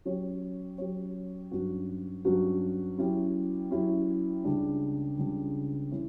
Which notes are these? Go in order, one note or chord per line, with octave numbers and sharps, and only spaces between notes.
F#3 C#4 G4 C#5
F#3 C#4 G4 C#5
G2 F#3 C#4 F#4
G2 F#3 C#4 F#4
F#3 C#4 E4 G4
F#3 C#4 E4 G4
C#2 C#3 G3 D4
C#2 C#3 G3 D4
E3 G3 C#4 E4